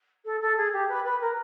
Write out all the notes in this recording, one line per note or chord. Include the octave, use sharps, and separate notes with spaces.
A4
A4
G#4
G4
B4
B4
A#4